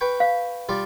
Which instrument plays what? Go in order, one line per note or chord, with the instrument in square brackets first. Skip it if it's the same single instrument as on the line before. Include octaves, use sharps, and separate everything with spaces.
[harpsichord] B4 G5 C#6
[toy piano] F5
[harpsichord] G3 F4 D5